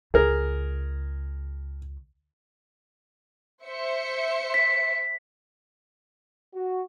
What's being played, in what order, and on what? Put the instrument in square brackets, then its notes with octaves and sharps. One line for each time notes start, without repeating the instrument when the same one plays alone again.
[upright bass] C#2 [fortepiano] G#4 A#4
[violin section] C5 E5 C#7
[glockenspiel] B6
[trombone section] F#4